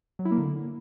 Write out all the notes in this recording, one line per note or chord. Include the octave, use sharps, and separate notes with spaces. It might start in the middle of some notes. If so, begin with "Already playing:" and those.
F#3
E4
A#3
D3